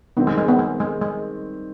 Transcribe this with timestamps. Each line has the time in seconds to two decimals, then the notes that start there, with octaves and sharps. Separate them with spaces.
0.17 D#3 G3 B3 C4
0.27 G#3
0.38 G#3
0.48 B3
0.59 G#3
0.80 G#3
1.01 G#3